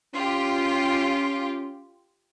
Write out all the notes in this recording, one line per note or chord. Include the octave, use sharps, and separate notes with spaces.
C#4 F4 G4